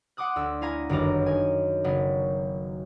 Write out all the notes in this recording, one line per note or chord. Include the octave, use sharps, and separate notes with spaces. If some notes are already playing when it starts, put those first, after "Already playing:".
F#5 C6 D6 D#6 F#6
D2 E6
E4 F5 G#5 A#5
G1 F#2 D#3 F#4 A#5 D6
D#4 G#5
F#1 F#3 B3